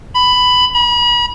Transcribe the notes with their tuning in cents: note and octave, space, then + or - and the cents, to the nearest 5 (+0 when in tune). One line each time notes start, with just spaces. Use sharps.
B5 +10
B5 -40